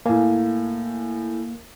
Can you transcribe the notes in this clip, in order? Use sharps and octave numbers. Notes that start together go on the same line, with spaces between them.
A2 A#3 G#5